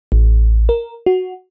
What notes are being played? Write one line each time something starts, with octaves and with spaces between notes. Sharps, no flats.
A1
A#4
F#4